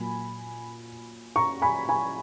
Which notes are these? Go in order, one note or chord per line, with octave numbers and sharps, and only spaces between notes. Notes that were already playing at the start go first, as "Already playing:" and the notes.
Already playing: A#2 F#3 A#3 G#5 B5
A#5 C#6
G#5 B5
G#5 B5